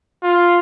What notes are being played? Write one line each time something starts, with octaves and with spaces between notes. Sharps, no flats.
F4